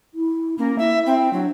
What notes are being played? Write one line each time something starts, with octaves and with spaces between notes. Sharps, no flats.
E4
A#3 C#4
E4 E5
C4
F#3 D4